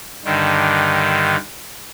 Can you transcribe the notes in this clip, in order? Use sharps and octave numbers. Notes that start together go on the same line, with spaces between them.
G2 D3 D#3